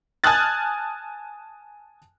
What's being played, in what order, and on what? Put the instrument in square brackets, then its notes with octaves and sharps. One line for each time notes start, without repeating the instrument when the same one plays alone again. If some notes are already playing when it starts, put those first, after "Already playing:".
[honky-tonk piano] G#5 A5 D#6 F6 F#6 A6